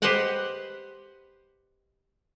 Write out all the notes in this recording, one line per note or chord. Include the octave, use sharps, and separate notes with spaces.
G4 B4 C5 D#5 F#5 G5